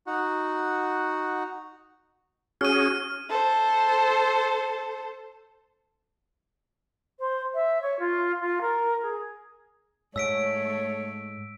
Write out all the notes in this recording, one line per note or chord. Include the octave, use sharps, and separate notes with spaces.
D#4 F#4 F#5
C#4 F#4 G#4 F6 D#7
A4 C5
C5
E5
C#5
F4
F4
A#4
G#4
G#2 A3 C#5 E6 B6 D7